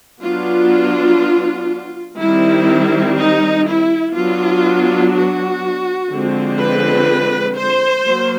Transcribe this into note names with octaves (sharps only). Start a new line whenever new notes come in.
F#3 B3 D4 F4
D#3 G3 C4 E4
D#4
E4
F#3 B3 D4 F4
F#4
D3 F3 G#3 C4
B4
C5
F#3 A#3